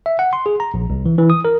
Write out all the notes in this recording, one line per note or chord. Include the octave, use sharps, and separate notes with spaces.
E5
F#5
C6
G#4
A#5
A#1
C2
E3
E3
D#6
A#4